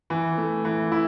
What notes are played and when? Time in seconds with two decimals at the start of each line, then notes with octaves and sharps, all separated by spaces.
0.10 E3
0.38 A3
0.65 E3
0.92 E4